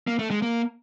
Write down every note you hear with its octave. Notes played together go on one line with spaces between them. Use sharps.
A#3
A3
G#3
A#3